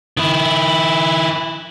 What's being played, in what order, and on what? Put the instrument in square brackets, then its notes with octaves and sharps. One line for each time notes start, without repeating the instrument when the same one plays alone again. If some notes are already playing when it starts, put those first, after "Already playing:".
[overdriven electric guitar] D#3 E4